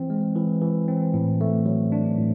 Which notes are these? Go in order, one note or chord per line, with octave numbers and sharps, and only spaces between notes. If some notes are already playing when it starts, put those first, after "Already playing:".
Already playing: E3 C4
G#3
E3
E3
C4
A2
A3
F#3
D4
A2